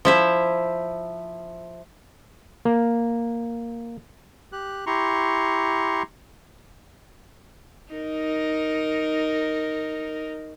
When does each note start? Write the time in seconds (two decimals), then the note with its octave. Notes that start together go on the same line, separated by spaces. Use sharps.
0.05 F3 E4 E5
2.65 A#3
4.52 G4 F#6
4.86 E4 G4 A#5 C6 C#6
7.93 D#4 A#4